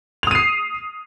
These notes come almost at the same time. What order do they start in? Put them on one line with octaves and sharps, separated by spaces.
F7 D#6 D#7 C7